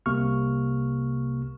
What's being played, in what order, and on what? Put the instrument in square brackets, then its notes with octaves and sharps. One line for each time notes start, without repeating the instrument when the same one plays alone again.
[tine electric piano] C2 C3 A#3 C#6 F6